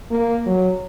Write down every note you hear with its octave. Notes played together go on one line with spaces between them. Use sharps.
A#3
F#3